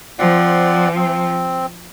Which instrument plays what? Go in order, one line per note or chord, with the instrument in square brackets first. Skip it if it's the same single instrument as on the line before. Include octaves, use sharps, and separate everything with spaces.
[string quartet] F3 [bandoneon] C4 D5 F#5
[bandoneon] C4